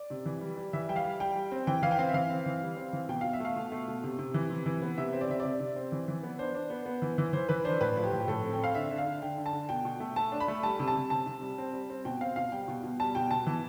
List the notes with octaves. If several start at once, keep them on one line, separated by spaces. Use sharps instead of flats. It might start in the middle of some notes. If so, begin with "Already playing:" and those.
Already playing: D5
C3
E3
G3
G3
E3 E5
G3 G5
F5
G3
G3 G5
G3
C4
E3 G5
E3 F5
G5
C4 F5
E5
E3 F5
C4
E3
G3
C4
E3
B2 G5
B2 F5
E5
A3 F5
B2
A3
B2
C3
C3
E3
C3
E3
B3
C3 E5
C4
D5
C3 E5
C3 D5
C3
C4
E3
E3
B3
D4 C5
D4
B3
B3
E3
E3
E3 C5
E3 B4
D4 C5
A2 B4
F3
G4
A2
G4
A2 A4
C4
G5
C4 F5
D3 E5
D3
F5
D3
D3 G5
D3
A5
D3
B2 G5
B2
A3
A3 A5
D4
B5
A3
G3 A5
C3
A5
C3
C3 A5
C3
G3
C4
G3
C4
B2 G5
C4 F5
B2 F5
G3 G5
B2
B2
G3 A5
B2 G5
B2 A5
E3